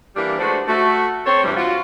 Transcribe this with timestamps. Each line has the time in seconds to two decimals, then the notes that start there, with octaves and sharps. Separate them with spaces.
0.15 E3 G3 A#3 D4 G4
0.38 G#3 A3 D4 F#4 B4 C5
0.67 A3 F#4
1.26 C4 A4 C5 C#5
1.43 G2 C3 E3 G3
1.56 F4 F#4